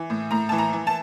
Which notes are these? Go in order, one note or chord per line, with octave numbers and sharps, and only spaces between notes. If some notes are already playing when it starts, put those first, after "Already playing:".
Already playing: E3
A2
A2 A#5
E3 A5
A#5
E3
A5